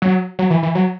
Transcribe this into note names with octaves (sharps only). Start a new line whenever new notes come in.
F#3
F#3
E3
E3
F#3